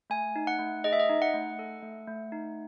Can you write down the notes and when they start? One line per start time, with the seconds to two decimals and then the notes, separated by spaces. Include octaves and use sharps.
0.10 A3 G#5
0.36 D#4
0.47 F#5
0.59 A3
0.84 G#4 D#5
0.93 E5
1.00 D#5
1.09 D#4
1.22 F#5
1.34 A3
1.59 A4
1.82 A3
2.07 A3
2.32 D#4